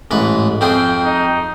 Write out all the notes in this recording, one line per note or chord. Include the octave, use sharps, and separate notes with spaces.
A1 G#2 B4
F2 C4 G#4 G5
D#4